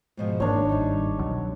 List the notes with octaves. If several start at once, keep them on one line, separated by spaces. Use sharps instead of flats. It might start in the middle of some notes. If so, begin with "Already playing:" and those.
G#2 B2 F3
G1 G#2 D#3 A#3 D4 C#5
G3 D#4
C2 B2 F#3